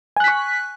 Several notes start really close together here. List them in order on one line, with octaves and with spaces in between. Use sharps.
G#5 F#6 B6 C#6